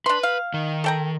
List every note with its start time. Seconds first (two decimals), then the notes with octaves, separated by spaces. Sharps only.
0.06 D4 B4 C6
0.23 F5
0.54 D#3
0.84 A4 G5 A#5